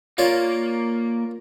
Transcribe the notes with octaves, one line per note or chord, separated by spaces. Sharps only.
A#3 F4 C#5 D5